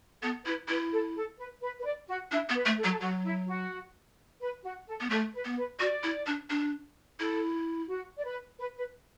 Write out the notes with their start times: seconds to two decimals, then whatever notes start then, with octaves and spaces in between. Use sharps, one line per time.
0.22 B3 A4
0.45 E4 B4
0.68 E4 B4
0.92 A4
1.15 A4
1.39 B4
1.62 B4
1.79 B4
1.85 D5
2.08 F#4
2.31 D4 E4
2.49 B3
2.55 B4
2.66 A3
2.78 A4
2.84 F#3 F#4
2.92 A4
3.01 F#3 F#4
3.24 E4
3.48 F#4
4.41 B4
4.64 F#4
4.87 A4
5.00 B3
5.10 A3 A4
5.34 B4
5.45 B3
5.57 B4
5.79 F#4 D5
6.03 E4
6.26 D4
6.50 D4
7.19 E4 A4
7.89 F#4
8.18 D5
8.24 B4
8.59 B4
8.77 B4